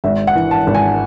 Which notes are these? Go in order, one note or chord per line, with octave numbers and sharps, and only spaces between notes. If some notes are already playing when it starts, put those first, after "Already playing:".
G#1 E5
F#5
E3
A5
G#1
G#5